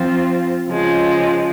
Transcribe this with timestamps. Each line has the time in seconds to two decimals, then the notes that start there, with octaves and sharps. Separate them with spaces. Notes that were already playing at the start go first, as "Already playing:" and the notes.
Already playing: F3 C4 F4
0.68 C#3 F3 G#3